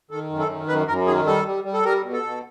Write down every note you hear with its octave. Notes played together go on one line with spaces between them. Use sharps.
D#3 A4
F#2
A4
D#3
F#2 B4
F#2 A#4
D#3 G#4
G3 A4
G3
G3
A4
G3 A#4
B2
A4
B2